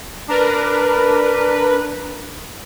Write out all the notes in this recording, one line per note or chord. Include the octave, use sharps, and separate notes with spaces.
D4 A#4 B4